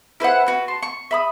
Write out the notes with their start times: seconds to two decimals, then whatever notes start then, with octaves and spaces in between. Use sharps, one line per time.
0.20 E4 B4 C5 F#5
0.47 F#4 B4
0.68 A5 C6
0.82 C#6
1.11 E5 B5 D#6